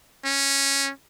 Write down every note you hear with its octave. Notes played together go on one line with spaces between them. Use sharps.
C#4